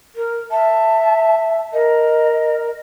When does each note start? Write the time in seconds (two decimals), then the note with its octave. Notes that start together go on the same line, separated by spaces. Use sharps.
0.15 A#4
0.51 E5 A5
1.73 A#4 D#5